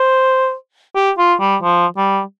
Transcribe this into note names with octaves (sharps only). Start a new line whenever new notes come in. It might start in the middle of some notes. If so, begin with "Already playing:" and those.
Already playing: C5
G4
F4
G3
F3
G3